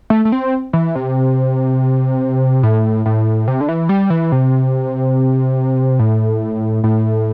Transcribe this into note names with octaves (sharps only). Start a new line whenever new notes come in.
A3
A3
C4
E3
C3
A2
A2
C3
D3
E3
G3
E3
C3
A2
A2